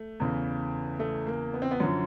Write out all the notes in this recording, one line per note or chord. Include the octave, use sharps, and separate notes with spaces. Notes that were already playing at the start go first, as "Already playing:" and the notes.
Already playing: A3
E2 C#3 E3
A3
A#3
B3
C4
B3
F#2 D3 F3 C#4